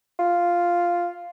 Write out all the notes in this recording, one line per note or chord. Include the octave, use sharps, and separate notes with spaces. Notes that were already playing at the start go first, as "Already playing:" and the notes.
F4